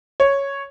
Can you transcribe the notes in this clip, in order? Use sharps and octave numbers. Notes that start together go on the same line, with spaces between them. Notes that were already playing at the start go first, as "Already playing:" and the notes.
C#5